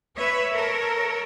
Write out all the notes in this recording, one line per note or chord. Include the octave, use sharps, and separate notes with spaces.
B4 C#5 E5
A4 A#4 C#5